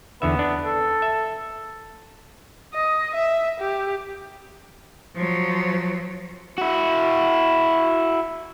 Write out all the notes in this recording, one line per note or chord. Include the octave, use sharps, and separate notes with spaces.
E2 D3 B3 E5
D4
A4
E5
D#5
E5
G4
F3 F#3
E4 F#4